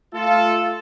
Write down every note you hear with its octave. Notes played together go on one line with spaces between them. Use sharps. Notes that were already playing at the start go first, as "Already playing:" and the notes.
A3 F4 A4